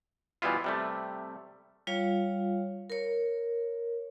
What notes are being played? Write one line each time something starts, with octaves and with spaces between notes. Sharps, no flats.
B2 E3 G3 B3 E4 F4
C3 G3 A3
G3 F4 C#5 F5
A#4 C#5